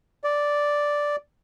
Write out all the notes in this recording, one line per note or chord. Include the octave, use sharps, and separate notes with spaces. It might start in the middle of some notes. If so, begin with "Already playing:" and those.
D5